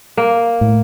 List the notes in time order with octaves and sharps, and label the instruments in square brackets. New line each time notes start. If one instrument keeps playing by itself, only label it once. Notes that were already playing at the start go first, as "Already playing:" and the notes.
[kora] A#3
[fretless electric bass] A2